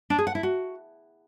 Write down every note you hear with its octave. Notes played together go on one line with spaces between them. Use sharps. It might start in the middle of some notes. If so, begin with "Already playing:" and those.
D4
G#4
F#5
E4
F#4